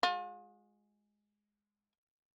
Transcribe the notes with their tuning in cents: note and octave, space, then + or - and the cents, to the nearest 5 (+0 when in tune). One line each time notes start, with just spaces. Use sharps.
G#3 +0 F4 +40